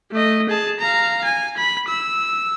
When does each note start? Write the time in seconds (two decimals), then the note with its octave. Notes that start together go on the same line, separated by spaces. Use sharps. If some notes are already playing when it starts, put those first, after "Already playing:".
0.12 A3 D#5
0.49 G#4 A5
0.79 F5 A#5
1.24 G#5
1.57 B5
1.88 E6